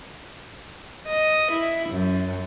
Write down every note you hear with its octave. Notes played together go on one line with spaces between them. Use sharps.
D#5
E4
F#2